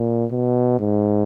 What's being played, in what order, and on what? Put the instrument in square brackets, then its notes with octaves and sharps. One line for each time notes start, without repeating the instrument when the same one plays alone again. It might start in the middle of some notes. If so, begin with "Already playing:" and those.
Already playing: [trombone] A#2
B2
G#2